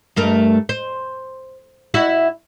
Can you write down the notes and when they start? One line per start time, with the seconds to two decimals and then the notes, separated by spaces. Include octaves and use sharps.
0.16 G2 A3 A#4
0.69 C5
1.94 E4 F#4 E5